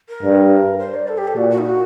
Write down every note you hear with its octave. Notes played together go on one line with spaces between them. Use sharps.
A#4
G2
C5
D5
A4
G4
A4
A#2 F#4
F#4
D#4
F#4